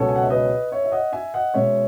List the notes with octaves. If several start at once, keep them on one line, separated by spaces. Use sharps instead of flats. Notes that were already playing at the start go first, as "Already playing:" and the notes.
Already playing: C#2 B2 F#3 C#4 A4 C#5
G#5
F#5
E5
B4 D#5
C#5 E5
E5
D#5 F#5
E5 G#5
D#5 F#5
B2 G#3 C#4 C#5 E5